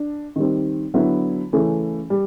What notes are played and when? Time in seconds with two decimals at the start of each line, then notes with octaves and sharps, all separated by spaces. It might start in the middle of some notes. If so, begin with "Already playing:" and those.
Already playing: D4
0.36 D#3 G3 C4
0.94 D3 F#3 B3 E4
1.53 C#3 E3 A3 C#4
2.10 G3